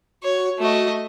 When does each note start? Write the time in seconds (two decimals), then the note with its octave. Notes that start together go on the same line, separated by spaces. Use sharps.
0.23 F#4 C#5
0.59 A3 F#4 D#5